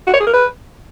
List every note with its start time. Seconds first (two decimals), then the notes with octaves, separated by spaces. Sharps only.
0.07 F#4
0.14 C#5
0.20 G#4
0.27 A#4
0.33 B4